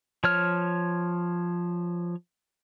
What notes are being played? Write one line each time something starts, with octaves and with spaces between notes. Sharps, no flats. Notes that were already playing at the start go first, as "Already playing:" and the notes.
F3 C#5 F6